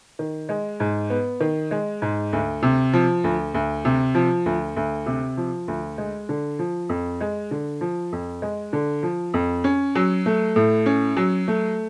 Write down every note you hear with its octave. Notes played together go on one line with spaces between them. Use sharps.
D#3
G#3
G#2
B3
D#3
G#3
G#2
D2
C3
F3
D2
D2
C3
F3
D2
D2
C3
F3
D2
G#3
D3
F3
F2
G#3
D3
F3
F2
G#3
D3
F3
F2
C#4
F#3
A3
A2
C#4
F#3
A3